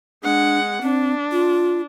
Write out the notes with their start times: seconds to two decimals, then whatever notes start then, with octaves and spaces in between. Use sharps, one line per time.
0.23 G#3 D4 F#5
0.82 C4 D4
1.32 F4